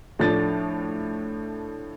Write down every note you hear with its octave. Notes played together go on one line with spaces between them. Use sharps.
A2 F3 A3 D4 A6